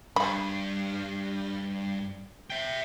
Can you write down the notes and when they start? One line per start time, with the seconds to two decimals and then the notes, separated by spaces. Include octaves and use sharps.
0.16 G2 B5
2.50 E5 G5